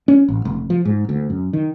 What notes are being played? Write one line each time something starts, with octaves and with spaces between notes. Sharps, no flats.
C#4
A1
F1
F3
G#2
D2
F#2
D#3